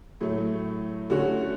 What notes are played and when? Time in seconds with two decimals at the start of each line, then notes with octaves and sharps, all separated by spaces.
0.21 A2 F#3 A3
1.10 D3 A3 C#4 F#4